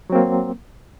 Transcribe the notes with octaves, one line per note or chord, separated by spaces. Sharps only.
F#3 A#3 C4